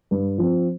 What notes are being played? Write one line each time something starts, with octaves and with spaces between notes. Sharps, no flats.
G2
F3 C4